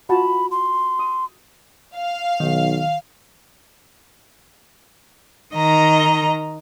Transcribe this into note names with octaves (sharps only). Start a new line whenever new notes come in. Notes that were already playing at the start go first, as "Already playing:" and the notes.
F4 F#4 A5 B5
C6
D#6
F5
B1 D#3
D#3 D#5 A#5